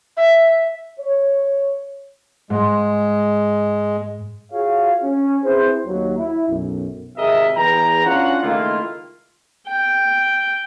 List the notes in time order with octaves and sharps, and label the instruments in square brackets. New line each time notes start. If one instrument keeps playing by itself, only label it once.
[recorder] E5
[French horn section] C#5
[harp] G#2 [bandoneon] G#3
[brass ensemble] F4 F#4 G#4 C#5 F5
C#4
C4 E4 G#4 B4 C5
D#2 F#3
E4
B1 F#2
G#1 C3 G#4 A#4 D#5 E5
E2 G#4 B4 G5 A#5
C#4 D4 F4 F#4 F#5
C#2 D#3 A3 A#3 E4 F4
[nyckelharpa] G5